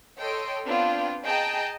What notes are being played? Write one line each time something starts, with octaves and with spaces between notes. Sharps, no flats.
A4 C#5 D#5 G5 C6 D7
B3 C4 D4 F4 G5
G#4 D#5 G5 A5 A#5 G6